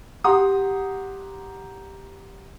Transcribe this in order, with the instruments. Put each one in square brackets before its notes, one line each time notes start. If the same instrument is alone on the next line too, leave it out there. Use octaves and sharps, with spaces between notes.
[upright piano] G4 F#5 A#5 C6 D#6